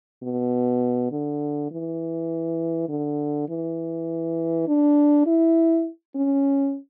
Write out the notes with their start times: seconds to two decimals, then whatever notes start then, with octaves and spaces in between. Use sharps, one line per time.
0.23 B2
1.12 D3
1.71 E3
2.89 D3
3.49 E3
4.68 D4
5.27 E4
6.16 C#4